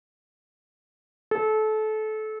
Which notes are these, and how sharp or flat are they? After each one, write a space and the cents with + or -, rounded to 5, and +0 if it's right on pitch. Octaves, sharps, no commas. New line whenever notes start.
A4 -25